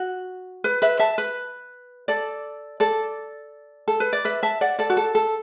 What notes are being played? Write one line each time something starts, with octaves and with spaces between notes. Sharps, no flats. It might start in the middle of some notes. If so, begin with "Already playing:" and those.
Already playing: F#4
B4
B4 E5
E5 A5
B4
A4 D5
A4 D5
A4
B4
D5
B4 E5
E5 A5
D5 F#5
A4 D5
F#4
A4
A4